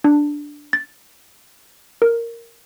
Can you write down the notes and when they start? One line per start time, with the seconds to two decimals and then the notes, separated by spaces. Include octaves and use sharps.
0.04 D4
0.73 A6
2.02 A#4